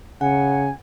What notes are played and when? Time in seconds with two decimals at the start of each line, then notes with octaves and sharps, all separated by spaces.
0.21 C#3 F#5 G#5